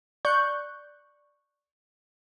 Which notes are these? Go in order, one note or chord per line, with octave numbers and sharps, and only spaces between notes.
D5 C#6 F#6 G6